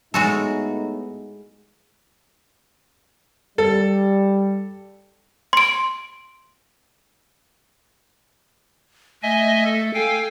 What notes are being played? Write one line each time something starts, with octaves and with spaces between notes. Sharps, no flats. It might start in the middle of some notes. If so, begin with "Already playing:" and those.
A2 G#3 B3 D#4 F#4 A4
G3 A4
C6 D7
A3 D#5 E5 G#5
A4
A4 F5 G5 G#5